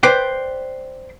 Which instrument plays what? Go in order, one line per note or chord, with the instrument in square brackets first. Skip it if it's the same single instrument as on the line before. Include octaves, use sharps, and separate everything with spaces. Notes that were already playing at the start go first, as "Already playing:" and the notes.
[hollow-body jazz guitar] B4 C5 D5 G5